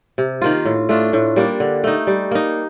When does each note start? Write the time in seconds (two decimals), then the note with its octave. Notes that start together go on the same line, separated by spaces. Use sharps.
0.18 C3
0.42 D#3 A#3 F4
0.65 A2
0.89 A3 D4 F4
1.13 A2
1.36 G3 A#3 D4
1.60 D3
1.84 A3 D#4
2.07 G3
2.31 A#3 D#4